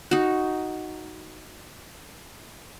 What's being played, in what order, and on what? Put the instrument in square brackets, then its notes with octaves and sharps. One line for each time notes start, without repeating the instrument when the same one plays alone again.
[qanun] D#4 F#4